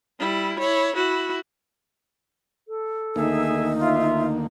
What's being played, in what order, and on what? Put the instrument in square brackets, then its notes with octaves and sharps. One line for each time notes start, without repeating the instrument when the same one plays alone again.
[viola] G3 E4
E4 C#5
E4 F#4
[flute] A4
[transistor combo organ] D2 D#3 A#3 [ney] D#4 [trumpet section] G#4 E5 G#5
[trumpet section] F4 [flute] E5